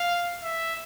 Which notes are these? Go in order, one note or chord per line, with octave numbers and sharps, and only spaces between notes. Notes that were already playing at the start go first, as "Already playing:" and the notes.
Already playing: F5
E5